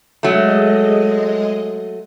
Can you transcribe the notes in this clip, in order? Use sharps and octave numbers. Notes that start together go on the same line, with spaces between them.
F#3 G#3 A3 D#5